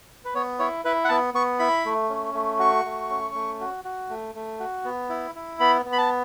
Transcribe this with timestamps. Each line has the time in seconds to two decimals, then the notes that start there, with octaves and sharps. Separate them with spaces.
0.25 B4
0.35 B3 C#5
0.59 E4 C#5
0.85 E4 B4
1.05 F#5
1.09 B3 A5
1.34 B3 C#6
1.59 E4 B5
1.85 A3
2.10 C#4
2.34 A3
2.59 F#4 C#6
2.85 A3
3.10 C#4
3.35 A3
3.60 F#4
3.85 F#4
4.10 A3
4.35 A3
4.60 F#4
4.85 B3
5.09 E4
5.35 E4
5.60 B3 B5
5.85 B3
5.93 B5
5.98 A5